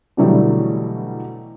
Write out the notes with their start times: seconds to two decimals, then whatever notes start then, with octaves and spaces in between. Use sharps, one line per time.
0.17 B2 D3 E3 F#3 G3 A3